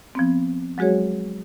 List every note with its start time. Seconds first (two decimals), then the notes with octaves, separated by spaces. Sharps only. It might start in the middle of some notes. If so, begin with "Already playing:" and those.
0.15 F3 B3 C4
0.78 F#3 G#3 F#4 G#4 C#5